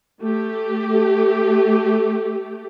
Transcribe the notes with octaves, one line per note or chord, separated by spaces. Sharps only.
A3 G4